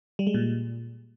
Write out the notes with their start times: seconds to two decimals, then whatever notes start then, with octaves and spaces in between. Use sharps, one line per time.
0.19 G3
0.27 G#3
0.34 A#2